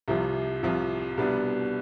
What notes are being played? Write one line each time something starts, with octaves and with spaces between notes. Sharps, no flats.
C2 C3 F3
C2 C3 F3
C2 B2 G3 B3 D4